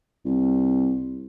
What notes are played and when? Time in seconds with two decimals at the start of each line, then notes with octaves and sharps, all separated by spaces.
0.25 C2